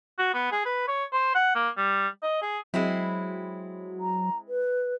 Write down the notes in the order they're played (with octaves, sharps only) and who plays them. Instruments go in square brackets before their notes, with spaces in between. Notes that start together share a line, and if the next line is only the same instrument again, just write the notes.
[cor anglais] F#4
B3
G#4
B4
C#5
C5
F#5
A#3
G3
D#5
G#4
[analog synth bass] F#3 [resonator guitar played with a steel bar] G#3 C4 E4
[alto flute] A#5
B4